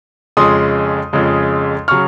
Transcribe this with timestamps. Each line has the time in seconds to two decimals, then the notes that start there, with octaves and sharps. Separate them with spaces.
0.37 F2 C#3 G#3 C6 D#6
1.13 F2 C#3 G#3
1.88 C#3 F#3 C#6 F6